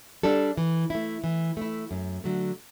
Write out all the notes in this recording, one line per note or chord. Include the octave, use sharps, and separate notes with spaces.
G3 D4 A4
E3
A3 E4
E3
A3 E4
F#2
D3 F#3 A3